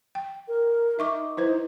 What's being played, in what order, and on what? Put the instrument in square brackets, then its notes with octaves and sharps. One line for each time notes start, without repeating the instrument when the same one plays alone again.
[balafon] G5
[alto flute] A#4
[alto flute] D#4 [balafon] E5 C#6 D6
[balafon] E4 B4 C5